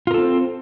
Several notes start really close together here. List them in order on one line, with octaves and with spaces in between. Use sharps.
F4 A#4 A4 C4